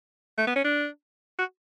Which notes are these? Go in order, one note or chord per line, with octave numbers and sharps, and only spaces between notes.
A3
B3
C#4
D4
F#4